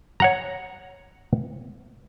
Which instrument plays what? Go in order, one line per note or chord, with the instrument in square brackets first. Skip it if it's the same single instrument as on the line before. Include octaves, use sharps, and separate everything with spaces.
[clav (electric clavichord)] C#5 F#5 A#5